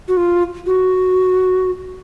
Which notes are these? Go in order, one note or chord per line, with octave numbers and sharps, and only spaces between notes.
F#4
F4
F#4